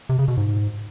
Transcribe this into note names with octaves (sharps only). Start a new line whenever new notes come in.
C3
C#3
B2
G#2